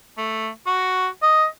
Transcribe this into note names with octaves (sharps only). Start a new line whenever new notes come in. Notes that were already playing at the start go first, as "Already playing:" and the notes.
A3
F#4
D#5